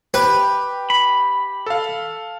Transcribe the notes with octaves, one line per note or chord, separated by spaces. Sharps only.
G4 B4 G5
B5
A4 F5